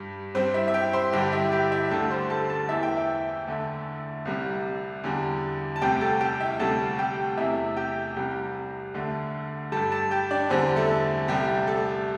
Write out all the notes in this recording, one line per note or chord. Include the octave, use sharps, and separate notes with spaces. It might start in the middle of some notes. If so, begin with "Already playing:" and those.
Already playing: G2 G3
G2 G3 C4 C5
E4 E5
E5
G4 G5
C5 C6
G2 D3 G3 G4 G5
E4 E5
G4 G5
E4 E5
D2 D3 G3 A4 A5
C5 C6
A4 A5
A4 A5
E2 E3 A3 E5
G5
E4 E5
D2 D3 A3
C2 C3 G3
E2 D3 G3
A5
D2 C3 G3 G4 G5
A4 A5
G4 G5
E4 E5
D2 C3 G3 A4 A5
G4 G5
E2 C3 A3 E4 E5
G4 G5
C2 C3 G3
D2 D3 A3
G2 G3 A4 A5
A4 A5
G4 G5
D4 D5
E2 D3 G3 C4 C5
A3 A4
C2 C3 G3 A3 G4
A3 A4